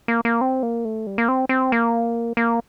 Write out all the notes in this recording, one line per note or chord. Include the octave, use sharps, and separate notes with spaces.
A#3
A#3
C4
A#3
A3
G3
A#3
C4
C4
A#3
A#3